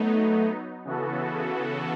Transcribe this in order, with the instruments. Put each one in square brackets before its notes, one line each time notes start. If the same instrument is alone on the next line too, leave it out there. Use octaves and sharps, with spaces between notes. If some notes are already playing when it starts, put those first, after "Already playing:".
Already playing: [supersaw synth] F#3 B3 D#4 [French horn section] A3
[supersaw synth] C#3 E3 B3 F#4 A4